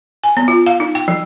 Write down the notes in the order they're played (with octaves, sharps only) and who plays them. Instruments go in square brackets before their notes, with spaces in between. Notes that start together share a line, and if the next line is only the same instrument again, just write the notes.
[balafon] G#5
B3
F4
F5
D#4
G5
F3